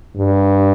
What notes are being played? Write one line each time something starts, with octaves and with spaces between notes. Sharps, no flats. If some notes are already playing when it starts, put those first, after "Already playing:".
G2